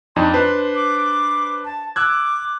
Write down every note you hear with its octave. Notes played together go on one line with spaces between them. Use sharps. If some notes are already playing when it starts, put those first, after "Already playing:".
F2 D4 D#4 C6
D4 B4 C5
D6
A5
D6 E6 F#6 G#6